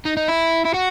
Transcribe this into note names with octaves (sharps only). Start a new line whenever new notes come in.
D#4
D#4
E4
E4
F#4